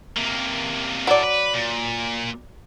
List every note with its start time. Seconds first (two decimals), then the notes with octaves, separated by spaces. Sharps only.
0.17 C3 A#3
1.07 F#3 E4 A4 D5
1.24 B4
1.54 A#2